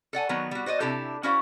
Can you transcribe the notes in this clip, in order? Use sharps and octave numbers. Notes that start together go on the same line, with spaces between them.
A4 D5 F#5 G#5
D#3 F#3 B3
G3 F#4
F#4 C5 D5 D#5
C3 D4 E4 G4 A4
C#4 E4 F#4 C5 D5 F5